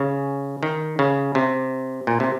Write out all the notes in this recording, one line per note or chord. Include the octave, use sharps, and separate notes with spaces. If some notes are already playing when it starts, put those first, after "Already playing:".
Already playing: C#3
D#3
C#3
C3
A#2
C3